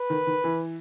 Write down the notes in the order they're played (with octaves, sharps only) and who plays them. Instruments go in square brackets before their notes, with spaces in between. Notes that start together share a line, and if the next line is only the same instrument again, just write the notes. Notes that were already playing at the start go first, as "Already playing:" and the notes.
Already playing: [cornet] B4
[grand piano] D#3
D#3
E3